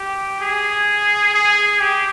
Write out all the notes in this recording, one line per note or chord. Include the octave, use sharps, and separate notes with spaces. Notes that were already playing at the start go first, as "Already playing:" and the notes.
Already playing: G4
G#4
G#4
G4